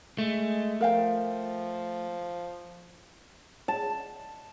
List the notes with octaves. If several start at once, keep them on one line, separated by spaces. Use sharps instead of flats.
G#3 A3
F3 A#4 F5 G5
A5